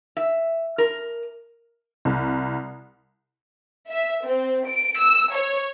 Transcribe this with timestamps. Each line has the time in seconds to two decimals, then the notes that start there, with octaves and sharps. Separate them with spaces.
0.17 E5
0.78 A#4
2.05 C2
3.90 E5
4.26 C4
4.68 D7
4.99 E6
5.34 C#5